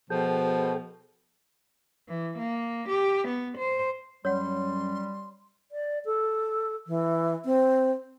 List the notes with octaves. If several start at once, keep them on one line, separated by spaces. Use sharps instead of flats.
B2 F3 G#4 A4 G5
E3
A#3
G4
B3
C5
F#2 G3 C#5 F#5 C6
D5
A4
E3
C4